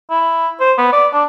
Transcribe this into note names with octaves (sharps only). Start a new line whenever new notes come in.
E4
C5
B3
D5
D4